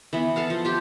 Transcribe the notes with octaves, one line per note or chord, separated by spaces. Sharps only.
E3 B3
A4 F5 F#5
F3
F4 G4